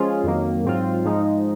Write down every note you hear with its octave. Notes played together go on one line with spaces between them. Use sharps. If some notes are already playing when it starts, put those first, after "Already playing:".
Already playing: F3 G#3 C#4 F4 G#4
F2 D#3 F#3 A#3
G#2 F#3 C4 F4
G#2 F3 G#3 D#4